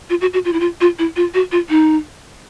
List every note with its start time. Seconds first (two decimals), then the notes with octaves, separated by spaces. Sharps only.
0.10 F4
0.21 F#4
0.34 F#4
0.45 F4
0.53 E4
0.60 F4
0.81 F4
0.99 E4
1.16 F4
1.34 F#4
1.52 F4
1.69 D#4